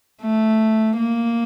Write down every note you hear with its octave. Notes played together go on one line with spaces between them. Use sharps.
A3
A#3